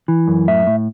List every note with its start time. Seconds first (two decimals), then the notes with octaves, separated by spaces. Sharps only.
0.08 E3
0.28 F#2
0.47 A2 E5
0.67 A2